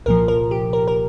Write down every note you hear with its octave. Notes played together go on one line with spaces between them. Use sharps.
C2 A#2 F3 A#4
A#4
G4
A#4
A#4